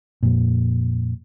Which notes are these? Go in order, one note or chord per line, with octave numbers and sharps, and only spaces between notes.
F2 A#2